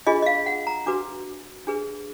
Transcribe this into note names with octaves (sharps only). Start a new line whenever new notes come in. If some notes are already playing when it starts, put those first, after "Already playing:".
D4 F4 G#4 D#5
D#5
F5
F#5
A#5
D4 F#4 B4 D6
D4 G#4 B4